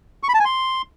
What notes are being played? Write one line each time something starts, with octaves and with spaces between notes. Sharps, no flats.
C#6
B5
A5
G#5
C6